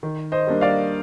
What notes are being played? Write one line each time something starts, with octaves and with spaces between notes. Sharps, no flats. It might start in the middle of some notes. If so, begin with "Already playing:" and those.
D#3
C5 D#5
G3 A#3 D4
D5 F5